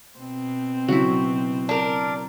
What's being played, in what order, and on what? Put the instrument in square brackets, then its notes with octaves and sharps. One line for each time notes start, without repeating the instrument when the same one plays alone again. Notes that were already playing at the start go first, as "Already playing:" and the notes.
[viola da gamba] B2 C4
[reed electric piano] C#3 F#3 [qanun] E4 F#4
[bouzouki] D4 A#4